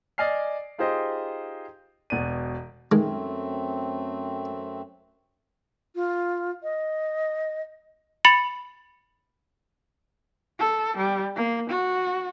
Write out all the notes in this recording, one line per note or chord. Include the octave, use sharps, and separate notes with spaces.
D5 D#5 G#5 F6 C7
D#4 F4 G4 G#4 C5 D#5
E1 B2 D5 D#7
F#2 D#3 G#3 A3 C4
F4
D#5
B5 A6 C#7 F#7
A4
G3
A#3
F#4